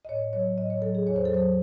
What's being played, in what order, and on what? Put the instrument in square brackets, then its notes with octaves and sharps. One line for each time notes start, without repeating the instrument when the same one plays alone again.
[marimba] D#5
A2 C#5
F#3 C#5
A2 D#5
C#5
F#3 A4
G#4
E2 C#5
C5
A4
F#3 C5